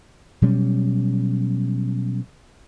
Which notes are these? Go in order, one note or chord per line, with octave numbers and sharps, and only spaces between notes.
B2 F#3 G3 C#4